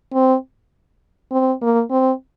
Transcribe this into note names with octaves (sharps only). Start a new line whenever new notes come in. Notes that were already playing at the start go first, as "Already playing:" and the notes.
C4
C4
A#3
C4